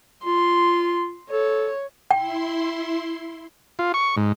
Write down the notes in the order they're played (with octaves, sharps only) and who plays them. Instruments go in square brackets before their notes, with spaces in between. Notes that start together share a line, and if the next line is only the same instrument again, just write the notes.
[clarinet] F4 [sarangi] C6
[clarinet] A4 [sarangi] C#5
[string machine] E4 C6 [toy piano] G5
[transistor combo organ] F4
C#6
G#2